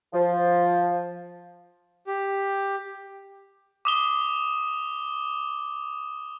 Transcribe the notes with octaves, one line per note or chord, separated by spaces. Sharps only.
F3
G4
D6 D#6 G7